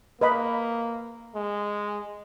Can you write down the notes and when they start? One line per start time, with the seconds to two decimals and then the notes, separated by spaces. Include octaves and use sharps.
0.21 A#3 B4 D#5 B5
1.35 G#3